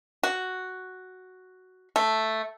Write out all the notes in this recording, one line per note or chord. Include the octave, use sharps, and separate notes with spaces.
F#4
A3